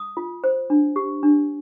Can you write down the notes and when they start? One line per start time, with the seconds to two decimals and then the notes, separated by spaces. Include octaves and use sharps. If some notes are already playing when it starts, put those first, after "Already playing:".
Already playing: D#6
0.17 F4
0.44 C5
0.70 D4
0.96 G4
1.23 D4